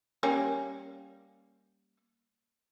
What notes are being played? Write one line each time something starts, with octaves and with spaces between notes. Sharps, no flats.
G3 A#3 C#4